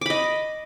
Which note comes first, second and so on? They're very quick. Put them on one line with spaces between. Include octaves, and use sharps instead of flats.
D6 B5 D#5